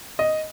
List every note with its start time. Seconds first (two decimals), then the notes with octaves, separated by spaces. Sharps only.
0.19 D#5